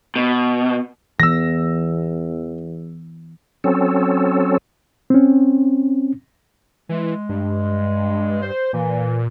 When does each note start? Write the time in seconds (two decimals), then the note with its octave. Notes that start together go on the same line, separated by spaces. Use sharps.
0.16 B2
1.20 E2 E3 B3 E6 A#6
3.64 F#3 C4 C#4 A4
5.10 C4 C#4
6.89 E3 G#3
7.29 G2
8.41 C5
8.73 A#2 E3